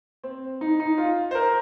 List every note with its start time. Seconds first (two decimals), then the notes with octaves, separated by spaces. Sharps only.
0.24 C4
0.61 D#4
0.80 D#4
0.98 F4
1.31 C5
1.35 A#4